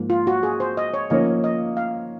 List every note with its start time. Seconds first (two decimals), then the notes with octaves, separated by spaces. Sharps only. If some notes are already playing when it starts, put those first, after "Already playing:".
Already playing: G#2 F3 A#3
0.10 F4
0.27 F#4
0.43 G#4
0.60 C5
0.77 D#5
0.94 C#5
1.10 F3 A#3 C#4 D#5
1.44 D#5
1.77 F5